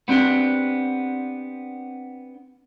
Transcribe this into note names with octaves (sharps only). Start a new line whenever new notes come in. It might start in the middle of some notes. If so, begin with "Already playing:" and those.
B3 C4 D4 G4